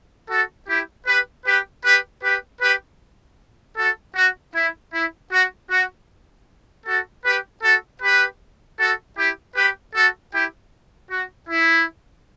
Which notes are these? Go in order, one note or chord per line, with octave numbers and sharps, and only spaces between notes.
F#4 A4
E4 G4
G4 B4
G4 B4
G4 B4
G4 B4
G4 B4
F#4 A4
F#4
E4
E4
F#4
F#4
F#4 A4
G4 B4
F#4 A4
G4 B4
F#4 A4
E4 G4
G4 B4
F#4 A4
E4 G4
F#4
E4